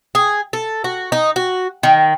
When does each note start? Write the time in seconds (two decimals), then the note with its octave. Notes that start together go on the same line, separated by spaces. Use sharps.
0.15 G#4
0.53 A4
0.84 F#4
1.12 D#4
1.36 F#4
1.83 D#3